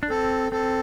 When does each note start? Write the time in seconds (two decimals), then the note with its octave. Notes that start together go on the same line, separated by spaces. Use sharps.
0.03 D4
0.10 C4 A4
0.52 C4 A4